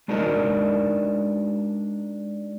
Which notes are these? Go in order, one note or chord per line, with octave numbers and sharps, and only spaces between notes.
G#3 D4 D#4 F#4 A#4 D#5